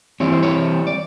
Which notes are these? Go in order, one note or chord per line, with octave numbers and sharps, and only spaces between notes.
E3 G3 C4 E4 C#5
C5
C#5
D5